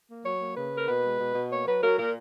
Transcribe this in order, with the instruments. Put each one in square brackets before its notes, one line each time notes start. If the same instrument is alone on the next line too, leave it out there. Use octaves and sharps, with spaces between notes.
[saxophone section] A#3
F#3 C#5
A#3
C#3 B4
A#3 A#4
B2 B4
G#3
B2
B2
A#3 C#5
F#3 B4
F#3 A#4
A#2 A#4